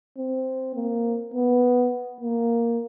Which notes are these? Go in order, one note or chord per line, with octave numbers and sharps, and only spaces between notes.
C4
A#3
B3
A#3